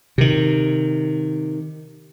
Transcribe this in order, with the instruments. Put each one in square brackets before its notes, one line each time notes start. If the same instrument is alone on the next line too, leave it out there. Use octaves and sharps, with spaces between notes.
[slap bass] C3 D#3